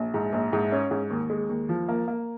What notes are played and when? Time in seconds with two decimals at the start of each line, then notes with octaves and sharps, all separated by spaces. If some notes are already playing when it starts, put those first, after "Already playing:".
Already playing: A#1
0.14 G#2
0.32 A#1
0.53 G#2
0.72 C#4
0.91 G#2
1.10 D#2
1.30 G#3
1.49 D#2
1.69 F3
1.88 A#3
2.08 A#3